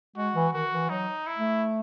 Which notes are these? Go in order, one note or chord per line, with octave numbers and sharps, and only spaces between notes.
G#3 F#4
E3
D#3 F#4
E3
F#3 D#4
E4
A3